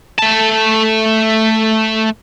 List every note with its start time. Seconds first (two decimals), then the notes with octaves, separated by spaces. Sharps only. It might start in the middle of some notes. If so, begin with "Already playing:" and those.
0.19 A3 A5